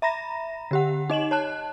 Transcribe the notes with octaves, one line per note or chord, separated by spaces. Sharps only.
E5 A#5 B5 A#6
D3 G4 F#5
D#4 D#5 E7 F#7
C#5 A5 F#6